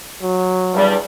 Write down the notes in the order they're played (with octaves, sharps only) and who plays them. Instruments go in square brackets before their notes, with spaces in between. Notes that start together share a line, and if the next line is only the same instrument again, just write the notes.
[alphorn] F#3
[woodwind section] E2 G2 G3